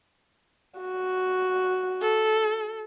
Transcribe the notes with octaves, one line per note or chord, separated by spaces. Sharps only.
F#4
A4